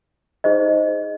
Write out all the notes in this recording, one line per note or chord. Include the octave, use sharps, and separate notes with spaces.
D#4 G#4 C5 D#5